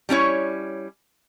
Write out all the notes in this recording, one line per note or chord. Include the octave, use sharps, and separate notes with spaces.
G3 C#4 E4 C#5